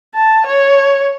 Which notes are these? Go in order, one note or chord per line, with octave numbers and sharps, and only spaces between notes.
A5
C#5